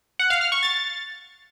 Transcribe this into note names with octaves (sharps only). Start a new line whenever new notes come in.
F#5
F5
F6
C#6
A6